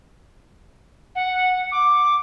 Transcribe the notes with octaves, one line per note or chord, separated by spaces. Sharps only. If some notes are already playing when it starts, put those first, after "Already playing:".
F#5
D6